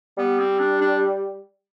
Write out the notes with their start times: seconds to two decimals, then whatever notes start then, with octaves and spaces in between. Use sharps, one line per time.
0.18 G3 B3
0.39 C4
0.60 D4
0.81 D4